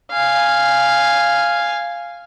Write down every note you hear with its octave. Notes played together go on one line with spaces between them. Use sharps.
F5 G#5